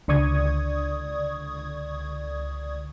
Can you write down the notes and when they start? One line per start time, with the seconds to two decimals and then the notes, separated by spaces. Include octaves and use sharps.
0.08 C#2 D3 D5 C#6 D#6 G#6